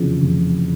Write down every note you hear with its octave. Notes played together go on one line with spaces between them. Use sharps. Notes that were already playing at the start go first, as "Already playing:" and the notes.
Already playing: F1 E2 C#3 F3
F1